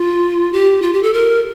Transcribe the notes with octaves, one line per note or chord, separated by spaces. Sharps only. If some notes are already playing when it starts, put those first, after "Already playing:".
Already playing: F4
G4
F4
G4
A4
A#4